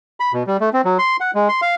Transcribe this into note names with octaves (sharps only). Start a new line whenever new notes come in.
B5
B2
G3
A3
C4
F#3
C6
F#5
G#3
C6
F5